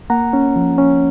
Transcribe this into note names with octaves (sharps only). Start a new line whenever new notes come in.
A#3 F#5 A#5
C#4
F3
C#4